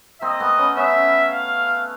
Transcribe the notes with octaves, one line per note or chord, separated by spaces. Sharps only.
A#3 C4 D#5
A3 B3
B3 C#4
B3 C#4 E5
F5